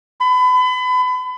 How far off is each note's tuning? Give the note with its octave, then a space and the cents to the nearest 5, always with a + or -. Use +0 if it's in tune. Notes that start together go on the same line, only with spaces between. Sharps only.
B5 +30